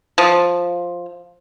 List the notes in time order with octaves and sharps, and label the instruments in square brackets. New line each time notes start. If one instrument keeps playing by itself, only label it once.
[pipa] F3